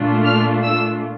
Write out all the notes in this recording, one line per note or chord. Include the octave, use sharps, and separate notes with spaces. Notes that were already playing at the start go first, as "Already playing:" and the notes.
Already playing: A#2 A3 D4 F4
F6
E6